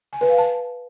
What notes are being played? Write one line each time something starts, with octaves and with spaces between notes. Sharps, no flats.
G#5
B4
F5
A5